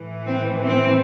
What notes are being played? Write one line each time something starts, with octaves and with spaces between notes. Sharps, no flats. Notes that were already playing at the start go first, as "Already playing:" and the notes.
Already playing: A2 E3
C4
C4